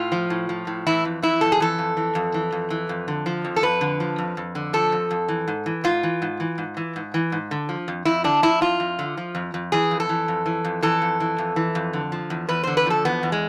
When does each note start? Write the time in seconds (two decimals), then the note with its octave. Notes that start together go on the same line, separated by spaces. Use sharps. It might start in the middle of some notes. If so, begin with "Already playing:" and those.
Already playing: A2 F4
0.12 F3
0.30 A2
0.49 F3
0.67 A2
0.86 E3 E4
1.05 F2
1.22 E3 E4
1.41 F2 A4
1.52 G#4
1.60 E3 A4
1.78 F2
1.97 E3
2.15 F2
2.34 E3
2.52 F2
2.70 E3
2.89 F2
3.08 D3
3.26 F3
3.45 F2
3.56 A4
3.63 F2 B4
3.81 D3
4.00 F3
4.18 F2
4.37 F2
4.55 D3
4.73 F3 A4
4.92 F2
5.11 F2
5.28 E3
5.48 G#2
5.66 E3
5.84 G#2 F4
6.03 E3
6.22 G#2
6.40 E3
6.58 G#2
6.77 E3
6.96 G#2
7.14 E3
7.32 G#2
7.51 D3
7.69 F3
7.88 F2
8.05 F2 E4
8.24 D3 D4
8.42 F3 E4
8.61 F2 F4
8.80 F2
8.99 D3
9.17 F3
9.35 F2
9.54 F2
9.72 E3 G#4
9.91 F2
10.00 A4
10.09 E3
10.28 F2
10.46 E3
10.64 F2
10.83 E3 A4
11.02 F2
11.20 E3
11.38 F2
11.56 E3
11.75 F2
11.93 D3
12.12 F3
12.30 E2
12.49 E2 B4
12.63 D3 C5
12.77 B4
12.86 F3 A4
13.05 E2 B3
13.23 E2
13.32 G#3